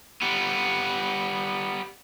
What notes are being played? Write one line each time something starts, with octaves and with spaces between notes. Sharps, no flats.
G3 B3